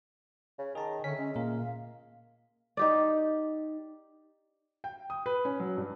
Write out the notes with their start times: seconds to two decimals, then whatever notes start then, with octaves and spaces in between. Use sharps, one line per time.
0.59 C#3
0.75 D#3 G#4 A5 A#5
1.04 D3 C#4 E5 B6
1.18 G#3 C#4
1.36 A#2 A#3 A#4 F5
2.77 D#4 G4 D5
4.84 G5
5.10 D#6
5.26 B4
5.45 C#4
5.60 F#3
5.77 G2